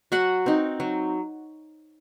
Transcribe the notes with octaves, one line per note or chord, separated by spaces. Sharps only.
F#3 F#4 F#5
C4 D#4
F#3